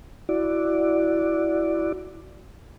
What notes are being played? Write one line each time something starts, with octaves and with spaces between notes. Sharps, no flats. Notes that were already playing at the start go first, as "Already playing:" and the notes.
E4 F#4 D5